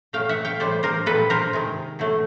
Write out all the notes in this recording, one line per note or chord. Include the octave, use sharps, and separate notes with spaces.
A#2 F#3 A3 F5 G5
E5 F#5
F5 G5
A2 E3 G3 C5 D5
A#4 C5
A#2 G3 A4 B4
A#4 C5
C3 D#3 G#3
B2 F#3 A3